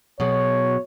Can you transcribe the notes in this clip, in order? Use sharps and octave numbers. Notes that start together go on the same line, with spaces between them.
B2 F#3 G#3 C#5